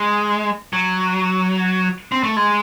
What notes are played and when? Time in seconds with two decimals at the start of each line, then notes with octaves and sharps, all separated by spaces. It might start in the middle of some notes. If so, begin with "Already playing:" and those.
Already playing: G#3
0.73 F#3
2.12 C4
2.23 A3
2.36 G#3